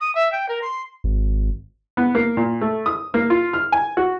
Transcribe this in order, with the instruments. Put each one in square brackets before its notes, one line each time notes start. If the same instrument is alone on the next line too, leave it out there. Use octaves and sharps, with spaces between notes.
[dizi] D#6
E5
G5
A#4
C6
[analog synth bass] G#1
[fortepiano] B3
A#3
A#2
A3
D#6
A#3
F4
F6
G#5
F#4